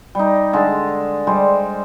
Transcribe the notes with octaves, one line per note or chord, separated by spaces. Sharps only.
G3 D#4
D3 G#3 A5
G3 G#3 C5